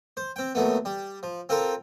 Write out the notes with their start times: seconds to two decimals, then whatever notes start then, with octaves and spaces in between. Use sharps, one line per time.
0.17 C5
0.36 C4 G5
0.55 D#2 F#3 A3 B3
0.85 G3
1.23 F3
1.49 C4 F4 A4 A#4 C5